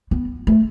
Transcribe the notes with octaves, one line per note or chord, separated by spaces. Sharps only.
B3
A3